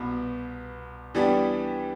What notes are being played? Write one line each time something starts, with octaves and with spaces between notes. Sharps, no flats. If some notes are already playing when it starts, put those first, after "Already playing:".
Already playing: C2 B2 B3
E3 G3 B3 D4 G4